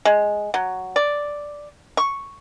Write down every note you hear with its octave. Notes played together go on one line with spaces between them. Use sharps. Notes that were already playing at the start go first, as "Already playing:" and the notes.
G#3
F#3
D5
C#6